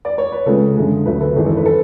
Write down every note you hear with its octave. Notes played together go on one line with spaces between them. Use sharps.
D5
C#5
B4
C#2 C#3 G#3 A4
F#2 D3 G#3
D2 C#3 F#3 A3 B4
A4
G#1 F#2 E3 G#4
A4
B4
A4